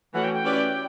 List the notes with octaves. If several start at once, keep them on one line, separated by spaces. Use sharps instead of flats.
E3 A3 C#4 F#4 F#5
G5
G5
C#4 E4 G4 B4 D5